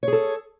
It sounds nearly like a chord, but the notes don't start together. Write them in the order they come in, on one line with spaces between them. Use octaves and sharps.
C#5 G#4 A4